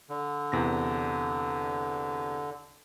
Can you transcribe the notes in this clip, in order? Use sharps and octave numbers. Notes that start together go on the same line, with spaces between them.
D3
E2 C3 A#6